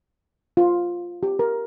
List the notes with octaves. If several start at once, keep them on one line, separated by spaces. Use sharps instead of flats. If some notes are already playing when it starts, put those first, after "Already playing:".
F4
G4
A#4